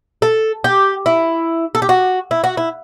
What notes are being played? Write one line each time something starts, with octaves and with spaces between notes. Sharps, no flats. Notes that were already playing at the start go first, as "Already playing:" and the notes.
A4
G4
E4
A4
G4
F#4
E4
F#4
E4